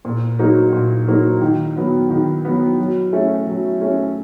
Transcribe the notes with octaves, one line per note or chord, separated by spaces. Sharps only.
A#2
F#3 A#3 D#4 F#4
A#2
F#3 A#3 D#4 F#4
D#3
F#3 B3
D#3
F#3 B3
F#3
A3 C#4
F#3
A3 C#4